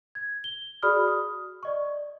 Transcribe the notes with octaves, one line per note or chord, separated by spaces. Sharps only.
G#6
G7
F#4 G#4 D5 B5 D#6 F6
D#6
D5 D#5 C#6